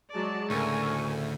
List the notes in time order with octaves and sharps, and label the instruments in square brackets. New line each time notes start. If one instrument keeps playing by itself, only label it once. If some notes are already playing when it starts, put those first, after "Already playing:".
[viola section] F#3 G#3 D5 [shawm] A5
[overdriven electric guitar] D2 [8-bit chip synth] A2 C#3 A3 [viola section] A4 A#4 G#5 [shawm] C#6